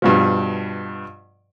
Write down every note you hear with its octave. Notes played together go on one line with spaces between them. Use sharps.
G2 B2 F3